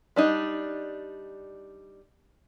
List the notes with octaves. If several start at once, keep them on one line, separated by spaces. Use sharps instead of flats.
G3 D4 D#4